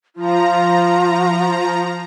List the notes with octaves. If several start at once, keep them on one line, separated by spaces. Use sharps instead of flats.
F3 F4 A#5